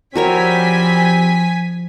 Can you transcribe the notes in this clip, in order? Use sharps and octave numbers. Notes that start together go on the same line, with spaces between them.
F3 G3 C4 F#4 A#4 C#5 G#5 B6